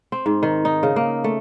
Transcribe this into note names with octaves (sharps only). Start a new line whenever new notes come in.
C4
G#2
D#3
D#4
C#3
A#3
A3